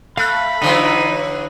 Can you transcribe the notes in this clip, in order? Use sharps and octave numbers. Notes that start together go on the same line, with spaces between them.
A3 F5 B5 F#6
D3 E3 F#3 D#4